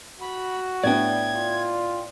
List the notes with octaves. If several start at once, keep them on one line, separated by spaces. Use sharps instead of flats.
F#4 B5
A2 B3 D4 D5 G5 G#6
F4